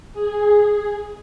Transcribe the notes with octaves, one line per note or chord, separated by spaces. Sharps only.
G#4